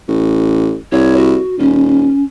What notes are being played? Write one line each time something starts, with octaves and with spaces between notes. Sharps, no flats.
A1
C2 C#5
F#4
D#1 C#4